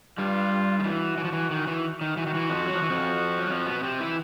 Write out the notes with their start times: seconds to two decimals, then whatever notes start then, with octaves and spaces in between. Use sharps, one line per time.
0.18 G2 G3 F4
0.79 D#3
0.84 E3 F#4
1.17 E3
1.25 F3
1.32 E3
1.51 D#3
1.67 E3
2.01 D#3
2.17 E3 F#4
2.27 D#3
2.34 E3
2.50 F2 F3
2.66 F#3
2.75 F3
2.83 E3
2.89 F2 F3
3.39 F#3
3.50 F2 F3
3.67 B2 B3
3.83 C3 C4
4.00 E3 E4